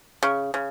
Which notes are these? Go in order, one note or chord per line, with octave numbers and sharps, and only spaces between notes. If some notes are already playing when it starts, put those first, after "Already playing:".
C#3
C#3